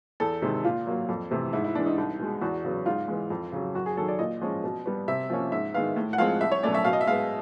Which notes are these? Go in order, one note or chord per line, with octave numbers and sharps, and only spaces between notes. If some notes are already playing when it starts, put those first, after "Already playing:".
E2 A4
C3 D#3 G#3
A#2 F4
F#3 A#3
F2
C3 E3 A3
G#2 E4
E4
E3 G#3 D4
D#4
C2
B2 G#3
E2 F#4
C#3 F#3 B3
G#2 F4
E3 G#3
F2
C#3 F#3
F#2 F#4
G#4
D#3 F#3 A4
D5
A#2 D#5
F3 G#3 C#4
B2
G3 B3
C3 E5
F3 A#3 C#4
G#2 E5
D#3 G#3 B3 F5
A2
F#5
F3 G#3 C4 F5
C2 E5
C#5
B2 F#3 A3 C#4 D5
E5
B2 F5
D#5
E5
G#3 B3 F5